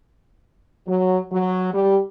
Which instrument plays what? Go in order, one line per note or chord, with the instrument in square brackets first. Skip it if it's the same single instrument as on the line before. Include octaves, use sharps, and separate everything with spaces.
[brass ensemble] F#3
F#3
G3